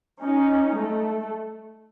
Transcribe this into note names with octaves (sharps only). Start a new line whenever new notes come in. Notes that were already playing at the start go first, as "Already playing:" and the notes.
C#4 D#4
A3